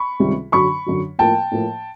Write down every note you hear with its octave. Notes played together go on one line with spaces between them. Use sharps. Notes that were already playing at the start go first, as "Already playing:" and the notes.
Already playing: B5 C#6
C#2 C3 D#3 G3
F#2 D3 F#3 B5 C#6
F#2 D3 F#3
A2 F3 A#3 G5 A5
A2 F3 A#3